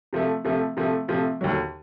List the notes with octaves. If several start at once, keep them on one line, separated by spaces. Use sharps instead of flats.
C3 F3 A3
C3 F3 A3
C3 F3 A3
C3 F3 A3
D#2 D3 F#3